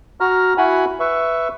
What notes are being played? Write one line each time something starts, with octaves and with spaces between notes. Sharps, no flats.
F#4 A#5 F6
E4 F#4 F#5 G#5 B5
B4 E5 C#6